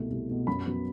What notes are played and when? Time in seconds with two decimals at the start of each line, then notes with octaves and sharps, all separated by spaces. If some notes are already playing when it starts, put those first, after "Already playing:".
Already playing: C2 B2 A3
0.10 C2
0.29 B2 A3
0.47 F#2 B5
0.66 F#3 B3